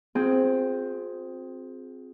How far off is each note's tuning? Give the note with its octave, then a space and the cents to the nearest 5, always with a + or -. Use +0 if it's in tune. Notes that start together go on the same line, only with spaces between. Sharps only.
C4 +0 F4 +40 G#4 +10